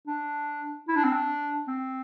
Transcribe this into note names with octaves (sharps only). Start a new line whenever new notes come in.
D4
E4
D4
C4
D4
C4